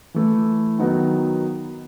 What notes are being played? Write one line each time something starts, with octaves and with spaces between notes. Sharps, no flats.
E3 A3 E4
D#3 F#3 B3 D#4